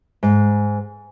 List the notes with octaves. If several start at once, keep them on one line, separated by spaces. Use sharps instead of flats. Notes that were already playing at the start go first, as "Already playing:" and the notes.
G#2